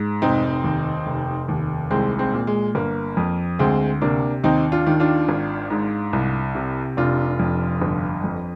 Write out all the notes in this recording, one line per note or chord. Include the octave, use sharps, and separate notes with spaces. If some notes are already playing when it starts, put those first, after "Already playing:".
Already playing: G#2
F1 C4 D#4
D#2
F1
D#2
C2 G#3 C4
G#3 C4
A#2
G#3
G1 A#3
F2
D2 G#3 C4
C3 A#3 D4
D#2 C4 D#4
D4 F4
D#3
D4 F4
G#1
G#2
C2
C3
F1 D4 F4
F2
G1
F2